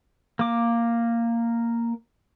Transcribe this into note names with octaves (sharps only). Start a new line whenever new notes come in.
A#3 D6